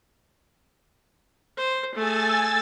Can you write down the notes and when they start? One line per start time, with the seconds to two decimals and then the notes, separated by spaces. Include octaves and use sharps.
1.57 C5
1.95 A3 G#4 G#5 E6 A6